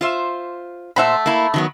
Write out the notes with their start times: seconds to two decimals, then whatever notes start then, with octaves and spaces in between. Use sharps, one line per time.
0.01 F4 C5 E5
0.96 A#2 A3 C5 E5 F#5 B5
1.26 A#3 E4
1.54 D#3 F#3 B3